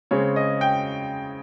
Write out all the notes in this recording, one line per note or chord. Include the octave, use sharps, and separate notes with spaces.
C#3 G#3 C4 C#5
D#5
G5